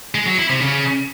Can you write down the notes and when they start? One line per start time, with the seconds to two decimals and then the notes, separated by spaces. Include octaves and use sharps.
0.15 G#3
0.26 F#3
0.38 E4
0.50 C3
0.62 C#3